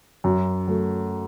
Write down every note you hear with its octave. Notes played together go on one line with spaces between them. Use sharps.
F#2
F#3 A3